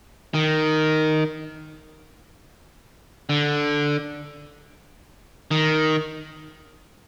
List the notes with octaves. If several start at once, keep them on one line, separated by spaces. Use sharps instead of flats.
D#3
D3
D#3